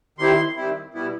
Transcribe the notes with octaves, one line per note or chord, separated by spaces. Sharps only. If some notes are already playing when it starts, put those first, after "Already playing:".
D#3 G3 C4 E4 C6
D#3 G3 C4 E4
B2 G3 B3 E4